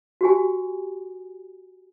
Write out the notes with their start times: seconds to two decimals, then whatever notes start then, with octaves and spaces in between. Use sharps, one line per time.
0.21 F#4 G4 G#5